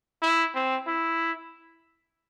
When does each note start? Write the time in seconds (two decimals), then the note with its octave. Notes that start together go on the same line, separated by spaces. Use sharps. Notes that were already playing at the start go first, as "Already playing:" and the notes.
0.22 E4
0.54 C4
0.87 E4